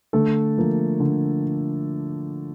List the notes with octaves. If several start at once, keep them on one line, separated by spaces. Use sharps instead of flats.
D3 A3 A4
F3 A#3
D3